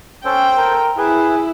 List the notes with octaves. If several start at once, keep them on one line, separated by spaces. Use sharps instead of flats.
C#4 A4 C5 G5
A#4
E4 G#4 B4